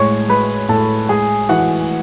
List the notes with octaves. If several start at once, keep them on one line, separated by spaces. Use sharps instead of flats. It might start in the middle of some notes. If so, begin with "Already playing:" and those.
Already playing: A2 G#3 C#5 C#6
G#3 B4 B5
A2 A4 A5
G#3 G#4 G#5
E3 F#4 F#5